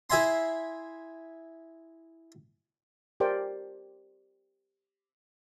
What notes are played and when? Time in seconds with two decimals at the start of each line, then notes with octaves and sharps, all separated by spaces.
0.10 E4 G#4 E5 G#5 A#5 C6
3.20 G4 A#4 C5 D5 G5